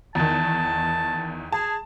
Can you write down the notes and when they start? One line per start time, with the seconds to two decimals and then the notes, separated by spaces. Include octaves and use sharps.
0.15 E2 D#3 A5
1.52 G#4 A5